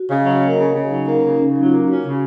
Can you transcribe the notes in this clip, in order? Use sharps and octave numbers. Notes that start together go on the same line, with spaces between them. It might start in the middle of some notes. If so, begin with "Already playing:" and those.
Already playing: F#4
C#3 D#5
C#5
F#3
C#5
A#3 D#5
C#3
C#3
F#3 D#4
A#3
C#4
C#3
C#3 C#4
F#3 D#4
F4
A#3 F#4
C#4
C#3